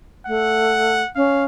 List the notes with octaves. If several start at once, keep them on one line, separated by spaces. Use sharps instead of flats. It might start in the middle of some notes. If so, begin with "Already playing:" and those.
A3 F#5
C#4 F5